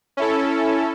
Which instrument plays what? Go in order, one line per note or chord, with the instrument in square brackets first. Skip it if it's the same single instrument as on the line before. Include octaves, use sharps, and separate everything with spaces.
[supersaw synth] C#4 E4 A4